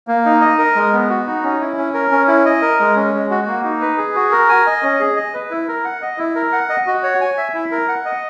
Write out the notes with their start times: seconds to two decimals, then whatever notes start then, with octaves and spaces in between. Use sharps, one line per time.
0.08 A#3
0.25 D#4
0.41 D#5
0.59 A#4
0.76 G#3
0.93 B3
1.10 F#4
1.27 D#4
1.43 C#4
1.61 E4
1.77 C#4
1.94 A#4
2.12 C#4
2.28 E4
2.45 D#5
2.62 A#4
2.80 G#3
2.96 C#4
3.14 G#3
3.30 F#4
3.47 A#3
3.64 D#4
3.81 B4
3.98 G#4
4.15 F#4
4.32 A#4
4.49 G#5
4.67 D#5
4.83 C#4
5.00 G#4
5.16 D#5
5.34 B4
5.51 E4
5.68 A#4
5.85 F#5
6.02 D#5
6.18 E4
6.35 A#4
6.52 F#5
6.69 D#5
6.87 F#4
7.03 C#5
7.21 G#5
7.37 E5
7.54 E4
7.72 A#4
7.88 F#5
8.05 D#5